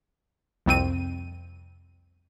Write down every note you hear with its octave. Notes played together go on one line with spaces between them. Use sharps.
C2 F2 C4 D#7